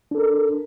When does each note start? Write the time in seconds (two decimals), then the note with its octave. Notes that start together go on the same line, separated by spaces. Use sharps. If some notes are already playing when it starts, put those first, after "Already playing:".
0.11 D4
0.15 A4
0.18 A#4